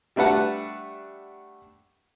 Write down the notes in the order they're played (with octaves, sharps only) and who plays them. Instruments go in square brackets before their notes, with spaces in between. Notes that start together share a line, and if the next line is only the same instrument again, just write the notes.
[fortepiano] G3 A3 D4 B4 F#5 A5